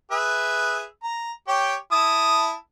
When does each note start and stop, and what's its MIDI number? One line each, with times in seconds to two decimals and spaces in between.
0.11 0.84 68
0.11 0.84 71
0.11 0.84 76
1.03 1.32 82
1.48 1.76 67
1.48 1.76 73
1.48 1.76 79
1.92 2.54 64
1.92 2.54 81
1.92 2.54 87